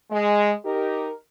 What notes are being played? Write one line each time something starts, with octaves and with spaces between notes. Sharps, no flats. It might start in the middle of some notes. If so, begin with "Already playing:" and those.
G#3
D#4 G4 A#4